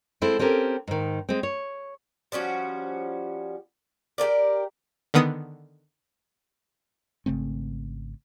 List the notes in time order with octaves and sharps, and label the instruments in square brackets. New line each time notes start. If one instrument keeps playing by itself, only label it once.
[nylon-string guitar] G#3 C4 E4 A4
C4 C#4 G4 A4 A#4
G#2 D#3
G#3 C4
C#5
[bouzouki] F3 G3 C#4 F#4
G4 A4 A#4 D5
[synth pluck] D3 D#3 B3 D#6
[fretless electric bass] G#1 C#3 A3 C4